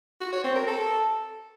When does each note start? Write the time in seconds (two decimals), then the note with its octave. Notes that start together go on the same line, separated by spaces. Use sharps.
0.21 F#4
0.32 C#5
0.44 C4
0.56 A#4
0.67 A4